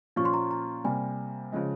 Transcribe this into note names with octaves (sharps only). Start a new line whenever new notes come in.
A#2 F3 A#3 C#4 F4 C#6
C6
A#5
A#5
C3 G3 A#3 G#5
C#3 F3 G#3